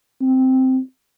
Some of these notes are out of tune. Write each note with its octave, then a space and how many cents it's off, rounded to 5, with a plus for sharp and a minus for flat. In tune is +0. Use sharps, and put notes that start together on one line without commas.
C4 -5